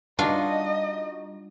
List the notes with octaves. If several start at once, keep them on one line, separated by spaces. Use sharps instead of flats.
G3 D4 D#4 F4 F#4 D#5